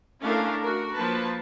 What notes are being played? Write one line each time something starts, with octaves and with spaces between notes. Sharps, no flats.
A3 C#4 D4 E4 A#4 F5
F#4 A#4
F3 A#3 B4 A5